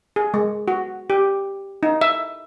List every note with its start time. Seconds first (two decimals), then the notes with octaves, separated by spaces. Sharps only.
0.16 G#4
0.34 G#3
0.68 F#4
1.10 G4
1.83 D#4
2.01 E5